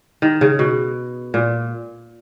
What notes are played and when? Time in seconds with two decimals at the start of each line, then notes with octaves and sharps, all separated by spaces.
0.22 D#3
0.41 C#3
0.59 B2
1.34 A#2